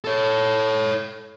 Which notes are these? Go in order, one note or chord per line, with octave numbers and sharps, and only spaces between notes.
A4 C#5